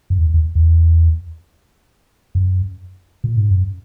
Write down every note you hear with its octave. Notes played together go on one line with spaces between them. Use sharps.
F#2
E2
E2
E2
F#2
A#2
G#2
F#2